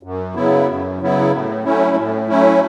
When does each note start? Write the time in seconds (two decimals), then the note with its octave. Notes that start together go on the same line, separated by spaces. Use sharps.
0.03 F#2
0.35 C#3 F#3 B3 E4
0.67 F#2
1.00 C#3 F#3 B3 E4
1.32 A2
1.64 F#3 A3 C#4 E4
1.97 A2
2.28 F#3 A3 C#4 E4